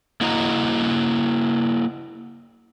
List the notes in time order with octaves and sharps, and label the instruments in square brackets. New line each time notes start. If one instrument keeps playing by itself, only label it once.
[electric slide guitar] A#3 E4 F#4 D#5 A#5